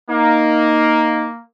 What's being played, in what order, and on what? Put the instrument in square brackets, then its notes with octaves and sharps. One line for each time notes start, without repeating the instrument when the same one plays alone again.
[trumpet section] A#3 [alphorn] D#4